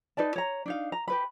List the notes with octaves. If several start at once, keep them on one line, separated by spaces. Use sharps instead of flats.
D#4 B4 D5 A5
C#5 A#5
D4 D#4 F5
A#5
G4 B4 B5